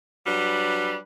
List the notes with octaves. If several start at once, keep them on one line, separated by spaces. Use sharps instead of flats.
F#3 G3 D4 B4